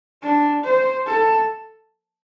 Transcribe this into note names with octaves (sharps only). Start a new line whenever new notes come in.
D4
C5
A4